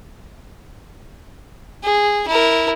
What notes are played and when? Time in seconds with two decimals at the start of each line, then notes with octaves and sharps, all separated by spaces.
1.83 G#4
2.27 E4 A#4